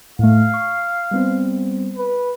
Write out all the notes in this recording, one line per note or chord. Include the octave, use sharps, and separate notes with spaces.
A2 A3 F5
C#6
G3 B3 C4
B4